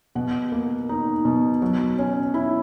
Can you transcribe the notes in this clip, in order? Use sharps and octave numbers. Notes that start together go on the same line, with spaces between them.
B2 F#5
A#3
D#4
B2
F#3
C#4
E4